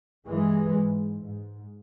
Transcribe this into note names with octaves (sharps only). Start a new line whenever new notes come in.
G2 E3 G#3
G#2
G#2